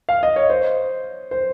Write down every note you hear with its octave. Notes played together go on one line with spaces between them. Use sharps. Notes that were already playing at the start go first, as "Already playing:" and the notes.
F5
D#5
C#5
C5
C5